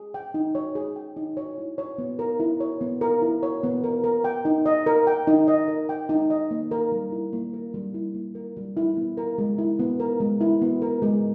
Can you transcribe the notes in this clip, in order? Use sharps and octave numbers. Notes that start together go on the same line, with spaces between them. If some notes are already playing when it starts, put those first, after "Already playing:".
Already playing: G#4
G5
D#4
C#5
G#4
G5
D#4
C#5
E4
C#5
B3
A#4
E4
C#5
B3
A#4
E4
C#5
B3
A#4
A#4
G5
D#4
D#5
A#4
G5
D#4
D#5
A#4
G5
D#4
D#5
A#3
A#4
G3
E4
A#3
A#4
G3
E4
A#3
A#4
G3
E4
B3
A#4
G#3
E4
B3
A#4
G#3
E4
B3
A#4
G#3